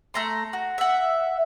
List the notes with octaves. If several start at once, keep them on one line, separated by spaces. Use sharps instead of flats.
A3 A#5 C6
F#4
E5 F#5